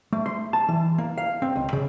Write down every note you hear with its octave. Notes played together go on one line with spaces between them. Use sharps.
A3
C6
A5
E3
A#3
F5
C4
C#2
C#3